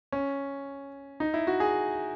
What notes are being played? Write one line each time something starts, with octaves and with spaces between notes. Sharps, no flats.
C#4
D#4
E4
F#4
G#4